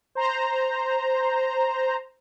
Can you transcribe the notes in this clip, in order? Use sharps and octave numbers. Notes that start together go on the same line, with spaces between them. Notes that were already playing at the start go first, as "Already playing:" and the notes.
C5 A#5